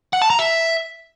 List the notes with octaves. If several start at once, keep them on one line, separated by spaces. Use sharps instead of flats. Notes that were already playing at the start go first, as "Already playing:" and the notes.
F#5
A5
A#5
E5